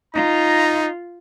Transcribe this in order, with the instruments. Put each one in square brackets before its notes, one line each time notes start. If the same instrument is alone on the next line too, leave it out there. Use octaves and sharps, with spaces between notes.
[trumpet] D#4 [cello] F4 [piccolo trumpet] A#5